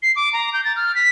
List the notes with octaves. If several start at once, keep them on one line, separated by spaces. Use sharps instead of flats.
C7
D6
A#5
G6
A6
F6
B6